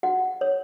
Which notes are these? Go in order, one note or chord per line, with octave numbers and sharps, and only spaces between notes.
F#4 F#5
C#5